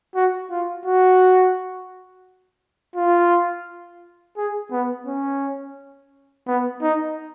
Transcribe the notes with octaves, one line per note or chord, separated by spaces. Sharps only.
F#4
F4
F#4
F4
G#4
B3
C#4
B3
D#4